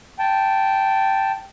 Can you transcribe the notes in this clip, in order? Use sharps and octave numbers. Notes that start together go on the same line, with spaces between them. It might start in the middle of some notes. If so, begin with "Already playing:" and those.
G5 A5